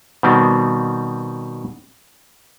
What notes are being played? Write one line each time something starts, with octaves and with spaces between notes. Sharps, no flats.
B2 D#3 G3 B3 C4